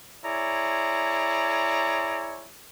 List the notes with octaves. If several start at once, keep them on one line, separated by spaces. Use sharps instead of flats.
E4 G#4 C#5 D5 A#5